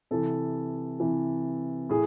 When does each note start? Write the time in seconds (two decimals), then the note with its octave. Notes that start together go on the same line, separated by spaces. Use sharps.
0.11 C3 E3 A4
1.00 C3 E3
1.89 A2 G#4